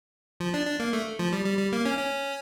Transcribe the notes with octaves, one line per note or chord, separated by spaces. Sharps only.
F3
D4
D4
A#3
A3
F3
G3
G3
G3
A#3
C#4
C#4